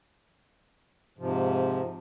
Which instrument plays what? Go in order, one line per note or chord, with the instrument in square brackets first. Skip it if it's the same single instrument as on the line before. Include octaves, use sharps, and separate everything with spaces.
[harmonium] G#2 C3 F3